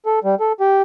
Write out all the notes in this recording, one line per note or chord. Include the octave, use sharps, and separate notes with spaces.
A4
G3
A4
G4